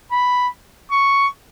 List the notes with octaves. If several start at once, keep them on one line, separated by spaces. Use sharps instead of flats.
B5
C#6